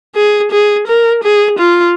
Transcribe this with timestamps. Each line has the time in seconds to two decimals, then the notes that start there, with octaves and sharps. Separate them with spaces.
0.15 G#4
0.51 G#4
0.87 A#4
1.23 G#4
1.59 F4